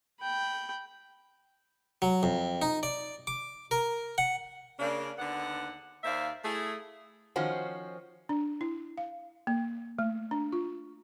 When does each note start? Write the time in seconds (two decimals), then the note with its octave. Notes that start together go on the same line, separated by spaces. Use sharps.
0.21 G5 B5
2.02 F#3
2.23 F2
2.62 D#4
2.83 D5
3.27 D6
3.71 A#4
4.18 F#5
4.79 C#3 A#3 D4
5.18 D#2 D3 B3 D5 F#5
6.04 D#2 A#3 C5 D5 E5 F5
6.43 A3 E4 G#4
7.36 D#3 F3 C#4 F#4 C5
8.29 D4
8.61 E4
8.97 F5
9.47 A#3
9.99 A3
10.31 D4
10.52 F4